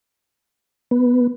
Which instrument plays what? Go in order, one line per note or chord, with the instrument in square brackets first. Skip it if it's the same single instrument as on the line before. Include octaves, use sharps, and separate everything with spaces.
[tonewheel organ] B3